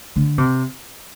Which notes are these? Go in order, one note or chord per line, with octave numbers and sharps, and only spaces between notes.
D3
C3